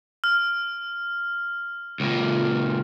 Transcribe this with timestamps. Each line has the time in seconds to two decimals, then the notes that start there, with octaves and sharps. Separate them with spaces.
0.24 F6
2.00 C#2 A#2